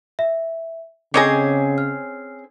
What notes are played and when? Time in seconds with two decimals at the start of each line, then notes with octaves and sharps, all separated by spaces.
0.19 E5
1.14 C#3 C4 C#4 G#4 C#5 D#5 A#5 D6
1.78 F6